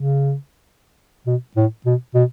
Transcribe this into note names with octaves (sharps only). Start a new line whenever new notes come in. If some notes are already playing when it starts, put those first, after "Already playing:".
Already playing: C#3
B2
A2
B2
B2